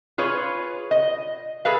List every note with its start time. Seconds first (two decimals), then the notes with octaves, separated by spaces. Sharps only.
0.18 F4 G#4 B4 C#5
0.91 D#5
1.65 G#4 A4 B4 F5